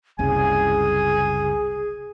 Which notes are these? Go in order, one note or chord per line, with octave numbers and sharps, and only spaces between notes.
F#1 C2 C#3 G#4 G#5